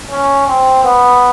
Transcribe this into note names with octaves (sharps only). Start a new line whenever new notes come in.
C#4
C4
B3